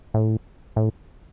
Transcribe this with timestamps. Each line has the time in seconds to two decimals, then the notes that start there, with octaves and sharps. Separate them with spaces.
0.14 A2
0.76 A2